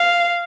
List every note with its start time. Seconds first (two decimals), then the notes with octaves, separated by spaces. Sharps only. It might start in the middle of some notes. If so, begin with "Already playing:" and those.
Already playing: F5